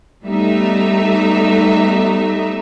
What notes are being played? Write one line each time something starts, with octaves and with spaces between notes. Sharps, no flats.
G3 A3 B3 D#4 E5